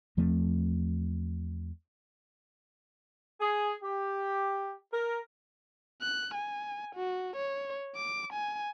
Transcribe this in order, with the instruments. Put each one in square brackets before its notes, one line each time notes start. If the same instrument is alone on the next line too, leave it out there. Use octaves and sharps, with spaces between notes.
[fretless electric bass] E2 F3 A3 C4
[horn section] G#4
G4
A#4
[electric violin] F#6
G#5
F#4
C#5
D6
G#5